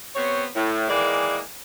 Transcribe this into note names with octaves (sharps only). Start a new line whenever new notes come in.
B3 C4 G4 C#5
A2
D#3 E3 G#3 A#3 G#4 D5